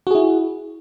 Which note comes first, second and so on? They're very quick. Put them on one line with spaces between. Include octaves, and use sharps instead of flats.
F#4 G#4 E4